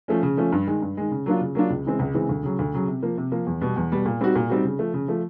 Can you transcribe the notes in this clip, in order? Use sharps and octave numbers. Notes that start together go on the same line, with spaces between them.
F3 A3 C#4
C#3
F3 A3 C#4
G2
D#3 G#3
G2
D#3 G#3
C#3
F#3 A#3 D4 F4
C#3
F#3 A#3 D4 F4
C#2
C#3 E3 G#3 C4
C#2
C#3 E3 G#3 C4
D2
C#3 F#3
D2
C#3 F#3
C3
F3 A#3
C3
F3 A#3
E2
B2 G3 B3
E2
B2 G3 B3
A#2
G3 C4 D#4 F#4
A#2
G3 C4 D#4 F#4
C#3
F3 A3
C#3
F3 A3